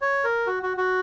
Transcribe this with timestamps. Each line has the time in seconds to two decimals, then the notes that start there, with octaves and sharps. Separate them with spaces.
0.02 C#5
0.24 A#4
0.47 F#4
0.63 F#4
0.77 F#4